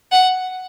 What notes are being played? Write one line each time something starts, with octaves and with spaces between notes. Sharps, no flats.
F#5